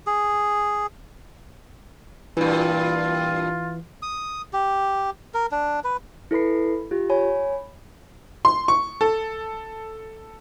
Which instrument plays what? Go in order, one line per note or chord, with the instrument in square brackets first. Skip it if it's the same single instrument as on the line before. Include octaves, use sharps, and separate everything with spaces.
[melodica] G#4
[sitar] G2 A#2 [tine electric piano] E3 [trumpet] F4
[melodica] D#6
G4
A#4
D4
B4
[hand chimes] E4 A4 B4 B5 C7
F4 G4
C#5 G#5 B5
[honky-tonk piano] C6
C#6
A4